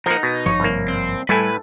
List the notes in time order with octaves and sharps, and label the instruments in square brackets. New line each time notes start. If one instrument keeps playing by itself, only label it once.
[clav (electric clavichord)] F3 A#3 [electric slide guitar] D#4 [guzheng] A#4 F#5
[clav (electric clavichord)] B2
[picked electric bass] G#1 G2 F3 [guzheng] C#5
[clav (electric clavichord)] C2 A#3
[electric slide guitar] C4
[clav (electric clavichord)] A2 E4 G#5 [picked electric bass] G3 [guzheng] A4 [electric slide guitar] B4